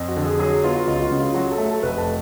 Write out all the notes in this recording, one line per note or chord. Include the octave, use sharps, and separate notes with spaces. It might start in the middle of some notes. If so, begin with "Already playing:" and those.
Already playing: F2
F#4
D3
G#4
F#3 G#4
B3 F4
F#4
C#2 F4
F#4
C#3
F4
F#3 F#4
A4
A3
A4
F1 B4
A5